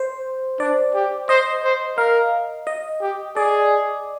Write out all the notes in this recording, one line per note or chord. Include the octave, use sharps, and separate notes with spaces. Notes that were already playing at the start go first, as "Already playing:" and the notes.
Already playing: C5
D4 D5
G4
C5 D#5
C5
A#4 F5
D#5
G4
G#4 D5